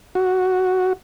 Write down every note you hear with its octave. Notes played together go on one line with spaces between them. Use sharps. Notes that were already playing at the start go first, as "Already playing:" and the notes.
F#4